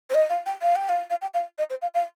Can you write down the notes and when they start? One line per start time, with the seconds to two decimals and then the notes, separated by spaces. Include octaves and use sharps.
0.10 C5
0.14 D#5
0.29 F5
0.46 G5
0.62 F5
0.76 G5
0.89 F5
1.10 F5
1.22 G5
1.34 F5
1.58 D#5
1.70 C5
1.82 F5
1.94 F5